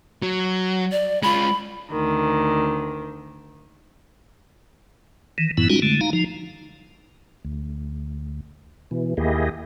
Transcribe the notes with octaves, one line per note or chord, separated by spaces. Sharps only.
F#3
D5
G#3 F4 B5
D2 D#3
D#3 E3
F#2 A2 E3 B3 E4
G3 G#3 C#4 D#4 F4 F#4
D3 G#3 A3
D#4 F5 A#5
F3 D#4
D2
B2 E3
D#2 A#3 E4 G4 G#4 D#5